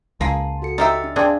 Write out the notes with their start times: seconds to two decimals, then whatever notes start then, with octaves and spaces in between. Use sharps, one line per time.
0.21 C#2 A#3 G#4 A5 C6
0.62 F#4 A4 C#7
0.78 A3 D#4 G4 C5 E5 C6 F6 A6
1.04 D4
1.16 C4 D4 G#4 F5